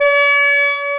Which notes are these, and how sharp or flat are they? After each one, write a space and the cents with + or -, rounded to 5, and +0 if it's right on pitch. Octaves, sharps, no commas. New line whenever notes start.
C#5 +45